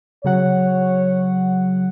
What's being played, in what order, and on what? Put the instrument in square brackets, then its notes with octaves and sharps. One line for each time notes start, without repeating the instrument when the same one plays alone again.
[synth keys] C#3 F#3 F#5 [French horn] C#5